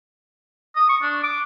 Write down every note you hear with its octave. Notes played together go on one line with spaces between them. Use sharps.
D#6
C#6
D4
D6